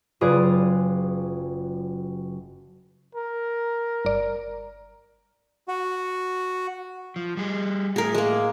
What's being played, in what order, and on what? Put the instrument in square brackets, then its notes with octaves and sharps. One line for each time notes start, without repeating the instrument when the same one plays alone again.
[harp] F#1 F4 G#4 B4 D5
[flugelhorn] A#4
[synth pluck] G1 D5
[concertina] F#4
[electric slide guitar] F3
G3 G#4
[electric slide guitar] A2 [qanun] G#4 A#4
[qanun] G#3 A#3